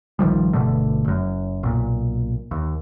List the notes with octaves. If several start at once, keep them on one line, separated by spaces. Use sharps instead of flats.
A#1 D#3 F3 G3
G1 B2 D3 A3
F#1 F#2
B1 A#2
D#2